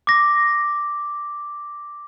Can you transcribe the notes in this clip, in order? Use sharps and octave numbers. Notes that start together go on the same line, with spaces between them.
D6 A#6